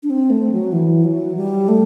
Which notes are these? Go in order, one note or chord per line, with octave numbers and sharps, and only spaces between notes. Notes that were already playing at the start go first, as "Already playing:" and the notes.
D4
C4
A3
F#3
E3
F#3
G3
A3